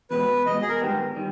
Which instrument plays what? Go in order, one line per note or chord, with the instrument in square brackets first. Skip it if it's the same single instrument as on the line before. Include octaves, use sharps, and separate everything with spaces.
[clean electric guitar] E2 B2 G#3 [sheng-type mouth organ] B4
[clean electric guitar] E2 B2 G#3 [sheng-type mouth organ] D#5
[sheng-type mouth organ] G#4
A#4
[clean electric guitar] G#2 D#3 G3 B3 G4
D#3 G3